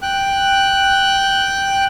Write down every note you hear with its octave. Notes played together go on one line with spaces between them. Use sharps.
G5 F#6